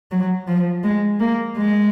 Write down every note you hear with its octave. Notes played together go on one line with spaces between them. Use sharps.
F#3
F3
G#3
A#3
G#3